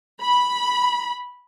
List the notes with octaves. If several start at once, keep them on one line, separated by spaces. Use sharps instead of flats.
B5